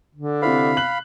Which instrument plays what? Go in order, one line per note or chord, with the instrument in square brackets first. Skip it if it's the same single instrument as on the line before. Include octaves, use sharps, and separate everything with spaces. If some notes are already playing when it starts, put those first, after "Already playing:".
[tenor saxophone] D3
[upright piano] C3 E4 C5 [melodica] F5 B5
[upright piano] F#6 F#7